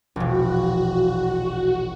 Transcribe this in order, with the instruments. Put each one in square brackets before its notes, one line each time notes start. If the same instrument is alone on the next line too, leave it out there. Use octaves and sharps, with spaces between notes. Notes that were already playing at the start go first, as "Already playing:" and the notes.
[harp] E1 A#1 [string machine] F#4